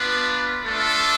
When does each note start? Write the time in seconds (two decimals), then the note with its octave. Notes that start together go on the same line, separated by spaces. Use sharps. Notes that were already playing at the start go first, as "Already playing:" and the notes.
Already playing: B3 D4 F4 B4
0.64 A3 D4 F4 A4